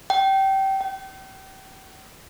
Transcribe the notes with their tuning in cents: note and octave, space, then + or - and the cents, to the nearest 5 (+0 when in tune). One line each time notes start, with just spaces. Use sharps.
G5 -20
G5 -35